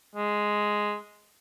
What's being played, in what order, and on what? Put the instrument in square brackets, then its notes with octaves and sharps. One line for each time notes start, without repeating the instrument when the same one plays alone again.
[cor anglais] G#3